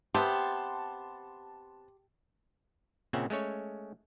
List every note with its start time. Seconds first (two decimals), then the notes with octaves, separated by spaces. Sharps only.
0.14 C3 B3 G4 A5 C6
3.13 A#2 C#3 C4 C#4 E5 F#5
3.30 G#3 A3 C#4 C#5